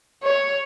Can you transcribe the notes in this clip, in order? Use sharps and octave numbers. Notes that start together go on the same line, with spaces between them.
C#5